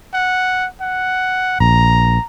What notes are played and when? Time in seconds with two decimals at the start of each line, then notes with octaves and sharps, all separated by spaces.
0.14 F#5
0.81 F#5
1.61 A#1 A#5